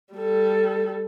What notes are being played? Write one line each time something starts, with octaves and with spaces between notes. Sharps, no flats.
G3 A4